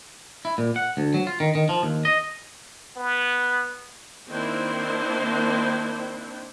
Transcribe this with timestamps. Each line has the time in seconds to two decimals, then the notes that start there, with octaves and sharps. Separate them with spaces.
0.45 E4
0.58 A#2
0.76 F#5
0.97 D2
1.14 F#3
1.27 F4
1.40 D#3
1.55 D#3
1.69 F3
1.83 D#2
2.05 D#5
2.97 B3
4.30 D#3 A#3 C4 D4 E4 C5